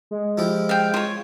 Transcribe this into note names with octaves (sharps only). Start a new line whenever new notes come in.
G#3
F3 E4 G4
F5 G5
F4 C#5